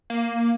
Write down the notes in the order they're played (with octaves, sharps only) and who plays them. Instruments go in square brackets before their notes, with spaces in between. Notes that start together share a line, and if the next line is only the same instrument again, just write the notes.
[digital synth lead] A#3